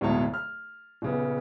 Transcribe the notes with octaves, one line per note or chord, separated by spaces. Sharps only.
D1 G#2 B2 C#5 A5
F6
D#1 C#3 B3